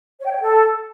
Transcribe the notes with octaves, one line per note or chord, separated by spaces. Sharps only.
C#5
G5
C#5
G5
A4